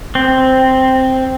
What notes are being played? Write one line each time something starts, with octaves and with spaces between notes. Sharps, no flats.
C4